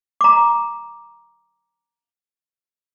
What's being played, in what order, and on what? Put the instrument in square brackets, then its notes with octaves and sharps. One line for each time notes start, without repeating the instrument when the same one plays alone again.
[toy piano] A#5 D6